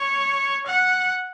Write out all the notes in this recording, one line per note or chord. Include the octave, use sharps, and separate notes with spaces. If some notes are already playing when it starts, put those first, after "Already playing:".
Already playing: C#5
F#5